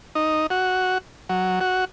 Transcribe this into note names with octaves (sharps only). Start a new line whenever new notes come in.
D#4
F#4
F#3
F#4